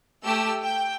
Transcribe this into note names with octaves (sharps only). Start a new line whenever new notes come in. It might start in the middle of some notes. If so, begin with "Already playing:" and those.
A3 G4 E6
G5